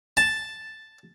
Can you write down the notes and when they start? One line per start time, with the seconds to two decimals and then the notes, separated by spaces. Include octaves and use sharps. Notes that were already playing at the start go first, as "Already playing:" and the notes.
0.17 A5